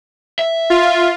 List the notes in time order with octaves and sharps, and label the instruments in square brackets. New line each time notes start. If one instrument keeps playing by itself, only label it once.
[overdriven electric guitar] E5
[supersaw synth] F4